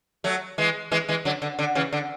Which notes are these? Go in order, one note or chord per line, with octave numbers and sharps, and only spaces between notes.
F#3 A3
E3 G#3
E3 G#3
E3 G#3
D3 F#3
D3
D3
C#3 E3
D3